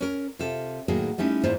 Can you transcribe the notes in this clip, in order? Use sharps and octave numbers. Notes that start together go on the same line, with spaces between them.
C#4 A#4
C3 F4 A4
A2 D#3 F#3 A#3 G#4
G3 A3 C#4 D#4 E4
E2 G#2 A#3 E4 F4 C5